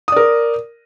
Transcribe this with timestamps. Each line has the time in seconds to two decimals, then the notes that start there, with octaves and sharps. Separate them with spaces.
0.08 D#6
0.12 D5
0.16 A#4